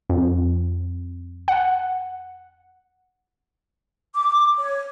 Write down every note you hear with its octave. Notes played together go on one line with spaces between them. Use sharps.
F2
F#5
D6
C#5